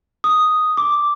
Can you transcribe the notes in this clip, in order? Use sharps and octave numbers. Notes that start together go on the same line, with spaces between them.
D#6
D6